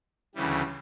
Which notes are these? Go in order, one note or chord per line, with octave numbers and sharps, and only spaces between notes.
D2 C#3 E3 G3